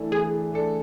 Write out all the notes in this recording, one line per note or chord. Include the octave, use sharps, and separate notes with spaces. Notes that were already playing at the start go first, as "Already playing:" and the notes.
Already playing: E3 A3 D4 E4 A4
E3 G#4
A3 D4 A4